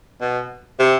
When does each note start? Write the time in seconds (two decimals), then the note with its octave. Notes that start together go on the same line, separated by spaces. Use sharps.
0.21 B2
0.79 C3